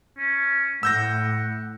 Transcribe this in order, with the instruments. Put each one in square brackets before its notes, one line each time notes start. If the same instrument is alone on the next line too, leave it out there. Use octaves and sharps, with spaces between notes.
[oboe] C#4
[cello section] A2 [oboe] F#5 [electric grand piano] E6 G6 A#6